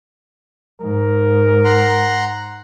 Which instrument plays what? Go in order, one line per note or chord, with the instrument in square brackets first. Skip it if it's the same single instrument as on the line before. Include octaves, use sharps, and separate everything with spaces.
[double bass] G#2 [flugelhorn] A#4
[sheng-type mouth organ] F#5 A#5 C6